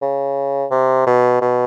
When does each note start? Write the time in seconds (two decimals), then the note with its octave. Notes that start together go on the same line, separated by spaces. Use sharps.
0.02 C#3
0.71 C3
1.07 B2
1.41 B2